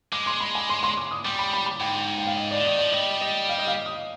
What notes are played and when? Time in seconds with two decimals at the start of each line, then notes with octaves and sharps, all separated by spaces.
0.13 G#3 D6
0.26 C6
0.40 B5
0.55 G#5
0.69 C6
0.83 C6
0.97 D6
1.11 D#6
1.25 G3 D6
1.39 B5
1.53 B5
1.66 B5
1.80 G#2 G5
2.18 G5
2.27 F5
2.36 D#5
2.51 D5
2.56 D3
2.65 D#3 D5
2.79 F3 D5
2.93 G3 D#5
3.21 D#5
3.49 F5
3.58 D#5
3.67 F5
3.86 D#6